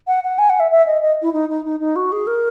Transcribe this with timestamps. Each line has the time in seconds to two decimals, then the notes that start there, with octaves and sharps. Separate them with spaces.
0.07 F#5
0.24 F#5
0.38 G#5
0.49 F#5
0.60 E5
0.71 E5
0.86 D#5
1.02 D#5
1.22 E4
1.33 D#4
1.49 D#4
1.65 D#4
1.80 D#4
1.96 F#4
2.12 G#4
2.27 A#4